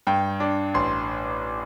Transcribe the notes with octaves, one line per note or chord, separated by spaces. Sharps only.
G2 G5
D4
A1 C6